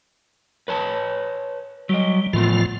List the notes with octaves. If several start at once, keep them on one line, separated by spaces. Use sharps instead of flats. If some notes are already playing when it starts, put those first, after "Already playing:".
B4 C#5 A5
F#3 G3 D#5
A2 E3 F3 A3 B3 F4